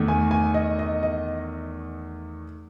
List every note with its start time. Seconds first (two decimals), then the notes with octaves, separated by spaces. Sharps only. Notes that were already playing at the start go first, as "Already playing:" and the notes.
Already playing: E2 D#3 A3
0.08 G#5
0.31 G#5
0.54 D#5
0.79 D#5
1.03 D#5